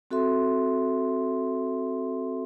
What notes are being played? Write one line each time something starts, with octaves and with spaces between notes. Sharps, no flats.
C4 F#4 A4 E5 C6